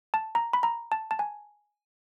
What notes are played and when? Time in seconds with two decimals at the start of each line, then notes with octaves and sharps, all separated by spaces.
0.14 A5
0.35 A#5
0.53 B5
0.63 A#5
0.92 A5
1.11 A5
1.19 G#5